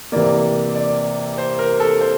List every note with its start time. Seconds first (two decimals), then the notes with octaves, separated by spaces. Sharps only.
0.12 C3 E3 A#3 D5
0.75 D5
1.38 C5
1.59 A#4
1.80 A4
2.01 C5